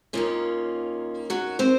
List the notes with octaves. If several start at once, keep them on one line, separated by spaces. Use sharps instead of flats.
D#2 D#3 A#3 C#4 F4
F#3 F#4
C4 C5